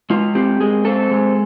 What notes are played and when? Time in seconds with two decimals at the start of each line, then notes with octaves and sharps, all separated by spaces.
0.10 G#3 F4
0.35 C4 G4
0.60 G#3 G#4
0.85 C4 A4
1.11 G#3